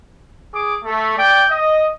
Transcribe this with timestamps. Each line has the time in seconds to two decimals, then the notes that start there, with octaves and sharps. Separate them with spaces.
0.53 G#4 D6
0.84 A3
1.18 D5 G5
1.50 D#5